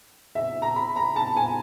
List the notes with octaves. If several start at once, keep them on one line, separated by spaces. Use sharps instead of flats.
E5
A#5
B5
A#5
A5
G#5